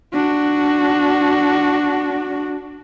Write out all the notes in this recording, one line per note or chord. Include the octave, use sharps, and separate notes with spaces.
D4 F#4